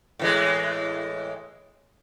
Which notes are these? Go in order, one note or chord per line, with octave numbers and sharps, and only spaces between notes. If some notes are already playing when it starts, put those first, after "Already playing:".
A2 E3 G#3